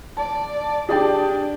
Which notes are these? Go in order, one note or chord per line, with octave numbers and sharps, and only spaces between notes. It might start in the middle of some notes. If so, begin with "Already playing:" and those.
D5 A5
D4 G4 G#4 D5 G5